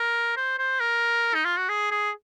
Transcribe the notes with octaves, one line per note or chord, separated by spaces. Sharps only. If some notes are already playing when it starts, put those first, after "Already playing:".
Already playing: A#4
C5
C5
A#4
D#4
F4
F#4
G#4
G#4